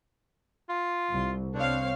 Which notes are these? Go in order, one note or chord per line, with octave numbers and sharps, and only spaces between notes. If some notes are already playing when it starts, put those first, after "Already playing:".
F4
C2
C2 C4 D4 C#5 F5